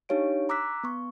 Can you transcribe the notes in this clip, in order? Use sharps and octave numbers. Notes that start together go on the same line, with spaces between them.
D4 D#4 G4 C#5 F5 D7
A#5 D6 E6 F#6 B6
B3 C#6